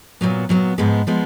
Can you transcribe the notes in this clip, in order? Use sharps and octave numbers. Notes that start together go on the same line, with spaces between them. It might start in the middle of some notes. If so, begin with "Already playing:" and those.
A#2 F#3 B3
A#2 F#3 B3
G#2 F3 G#3 B3
F3 G#3 B3